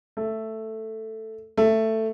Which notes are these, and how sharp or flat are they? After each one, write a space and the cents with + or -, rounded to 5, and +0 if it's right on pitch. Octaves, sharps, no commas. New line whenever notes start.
A3 +5
A3 +10